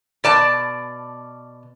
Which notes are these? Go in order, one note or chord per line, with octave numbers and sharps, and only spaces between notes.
B2 D5 A5